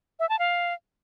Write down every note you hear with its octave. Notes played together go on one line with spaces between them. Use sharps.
E5
A5
F5